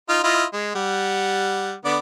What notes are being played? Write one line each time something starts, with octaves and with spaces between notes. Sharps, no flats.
D#4 F4
E4 F4 D#5
G#3
G3 F#5
D3 B3 D5